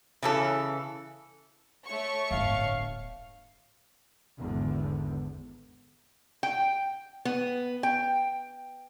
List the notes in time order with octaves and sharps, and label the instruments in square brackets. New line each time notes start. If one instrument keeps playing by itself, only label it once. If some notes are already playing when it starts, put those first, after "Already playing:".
[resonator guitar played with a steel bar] C#3 E3 A4
[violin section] A3 C#5 C#6
[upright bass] D1 G1 [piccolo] F5
[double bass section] G#1 E2 D3
[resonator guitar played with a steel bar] G5
B3
G5